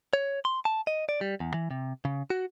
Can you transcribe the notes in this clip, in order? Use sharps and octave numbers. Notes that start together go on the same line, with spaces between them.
C#5
C6
A5
D#5
D5
G3
E2
E3
C3
C#3
F#4